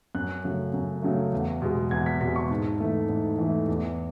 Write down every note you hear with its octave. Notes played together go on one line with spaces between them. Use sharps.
F#2 F#6
C#3 F#3 A3
F#2
C#3 F#3 A3
E2
B2 G#3
E2 G#6
B6
B2 G#3 B6
C#6
G#2 A5
E3 A3
G#2
E3 A3
E2